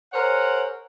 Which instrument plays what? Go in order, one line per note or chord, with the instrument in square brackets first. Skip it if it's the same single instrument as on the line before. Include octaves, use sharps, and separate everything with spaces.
[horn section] G#4 A#4 C5 C#5 F#5